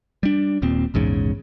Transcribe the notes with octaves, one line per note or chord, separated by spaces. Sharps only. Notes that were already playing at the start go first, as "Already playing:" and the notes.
G3 D4
D#1 D#2 A#2 C4
A#1 E2 G#2 C#3